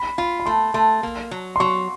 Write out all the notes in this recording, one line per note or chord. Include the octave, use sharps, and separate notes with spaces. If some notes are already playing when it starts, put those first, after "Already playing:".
Already playing: B5
F4 B5
B5
A3 C6
A3 C6
A#3
F#3
C6
F#3 C#6